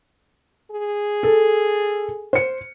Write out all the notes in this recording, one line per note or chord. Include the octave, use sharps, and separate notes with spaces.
G#4
A4
C5 C#7